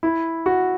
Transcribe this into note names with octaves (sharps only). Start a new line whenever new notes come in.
E4
F#4